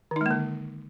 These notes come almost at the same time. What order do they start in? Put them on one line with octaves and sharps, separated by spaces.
D#3 D#4 G#3 A#3 D3